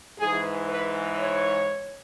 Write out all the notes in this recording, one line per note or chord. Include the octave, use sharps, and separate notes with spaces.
G#2 E3 G#4
B4
C#5